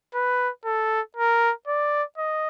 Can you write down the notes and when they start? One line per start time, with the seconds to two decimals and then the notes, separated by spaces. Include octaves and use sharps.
0.14 B4
0.65 A4
1.17 A#4
1.67 D5
2.18 D#5